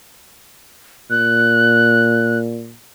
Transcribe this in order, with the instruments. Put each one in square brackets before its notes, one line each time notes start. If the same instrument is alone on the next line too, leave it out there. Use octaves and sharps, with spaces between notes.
[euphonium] A#2 [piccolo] F#6